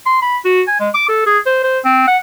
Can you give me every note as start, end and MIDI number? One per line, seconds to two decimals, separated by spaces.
0.06 0.20 84
0.22 0.37 83
0.45 0.62 66
0.67 0.76 80
0.80 0.89 56
0.94 1.05 86
1.09 1.26 69
1.26 1.38 68
1.46 1.59 72
1.63 1.79 72
1.84 2.04 60
2.07 2.17 78